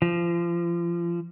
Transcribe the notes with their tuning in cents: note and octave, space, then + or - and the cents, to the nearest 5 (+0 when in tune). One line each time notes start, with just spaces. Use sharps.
F3 -30